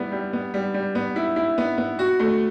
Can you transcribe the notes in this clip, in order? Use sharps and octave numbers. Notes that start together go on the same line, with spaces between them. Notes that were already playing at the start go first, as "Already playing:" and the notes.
Already playing: G3 B3 E4
G3
B3
G3
G3
B3
E4
E4
B3
B3
F#4
A3